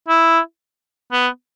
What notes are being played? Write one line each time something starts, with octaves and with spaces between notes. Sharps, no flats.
E4
B3